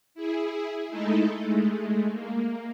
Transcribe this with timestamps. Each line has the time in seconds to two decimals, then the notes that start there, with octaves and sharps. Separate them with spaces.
0.14 E4 G#4
0.88 G#3 A3 D#4 E4 A4
1.38 G#3 A3
2.11 A#3